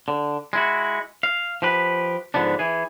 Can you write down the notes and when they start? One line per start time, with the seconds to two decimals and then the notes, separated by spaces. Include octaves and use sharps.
0.08 D3
0.53 G#3 E4 F#4
1.23 F5
1.62 F3 G4 B4
2.34 G#2 B2 D3 F3 B3 D4
2.59 E3 G#4